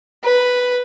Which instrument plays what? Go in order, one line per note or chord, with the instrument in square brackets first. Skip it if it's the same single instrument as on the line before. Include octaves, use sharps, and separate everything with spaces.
[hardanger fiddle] B4